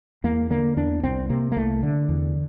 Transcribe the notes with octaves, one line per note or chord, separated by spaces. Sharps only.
E2 A#3
D3 A#3
E2 D4
C2 C4
C3 A#3
A#3
C2 A3
D3
E2